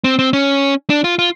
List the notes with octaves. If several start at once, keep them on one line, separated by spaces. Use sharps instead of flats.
C4
C4
C#4
D4
F4
F4